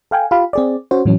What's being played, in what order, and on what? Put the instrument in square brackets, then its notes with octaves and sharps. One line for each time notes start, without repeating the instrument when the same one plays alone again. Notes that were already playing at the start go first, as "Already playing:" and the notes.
[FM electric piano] A4 F5 G5 G#5
F4 G4 F5 B5
C4 G#4 D5
C#4 F#4 C5
A2 E3 F#3 C#4